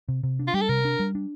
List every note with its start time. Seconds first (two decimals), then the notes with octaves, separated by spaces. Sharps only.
0.08 C3
0.23 C3
0.39 D4
0.47 F4
0.54 G3 G4
0.62 A4
0.69 C3 A#4
0.85 D4
1.00 G3
1.15 D4